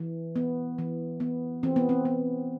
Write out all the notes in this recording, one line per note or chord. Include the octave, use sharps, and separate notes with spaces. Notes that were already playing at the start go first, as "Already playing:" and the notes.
Already playing: E3
B3
E3
B3
E3 C4
B3
C4
B3